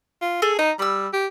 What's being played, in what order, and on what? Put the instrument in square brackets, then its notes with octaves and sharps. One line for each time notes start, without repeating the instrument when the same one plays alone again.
[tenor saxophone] F4
[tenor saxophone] G#4 [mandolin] A4
[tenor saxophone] D#4 [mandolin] A#5
[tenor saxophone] G3 [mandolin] B5 E6
[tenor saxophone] G4